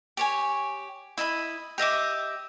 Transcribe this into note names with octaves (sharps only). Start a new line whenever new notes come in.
G4 C#5 G#5
E4 D#5 F5 B5
G4 D#5 E5 D6